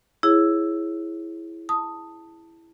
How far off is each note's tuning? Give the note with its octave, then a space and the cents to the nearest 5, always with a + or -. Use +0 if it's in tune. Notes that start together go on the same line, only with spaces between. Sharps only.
E4 +5 G#4 +0 C#5 -15
A5 +15 D#6 +0